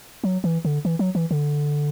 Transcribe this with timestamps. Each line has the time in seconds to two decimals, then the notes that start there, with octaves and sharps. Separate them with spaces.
0.24 F#3
0.44 E3
0.65 D3
0.85 E3
0.99 F#3
1.15 E3
1.31 D3